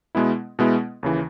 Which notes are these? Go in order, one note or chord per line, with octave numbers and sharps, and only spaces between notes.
B2 G#3 B3 E4
B2 G#3 B3 E4
D#2 C#3 E3